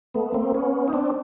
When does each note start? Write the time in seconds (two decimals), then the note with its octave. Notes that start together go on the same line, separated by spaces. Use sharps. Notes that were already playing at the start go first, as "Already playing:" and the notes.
0.14 A3 B3
0.34 A#3 C4
0.54 B3 C#4
0.88 D#4
0.93 C4 D4